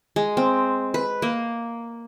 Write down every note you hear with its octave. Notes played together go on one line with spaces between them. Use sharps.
G#3
C4
B4
A#3